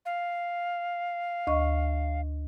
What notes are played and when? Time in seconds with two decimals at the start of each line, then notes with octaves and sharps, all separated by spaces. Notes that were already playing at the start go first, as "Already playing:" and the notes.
0.06 F5
1.47 D2 D#5 C#6